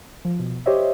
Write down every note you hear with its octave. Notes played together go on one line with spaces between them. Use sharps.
F3
B2
G4 C5 C#5 D#5 E5